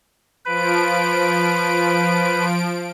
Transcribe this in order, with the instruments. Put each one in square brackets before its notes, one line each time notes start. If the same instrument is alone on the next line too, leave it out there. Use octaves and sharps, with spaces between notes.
[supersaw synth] F3 D7 [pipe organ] B4